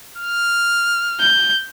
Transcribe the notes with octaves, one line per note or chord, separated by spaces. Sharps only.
F6
G6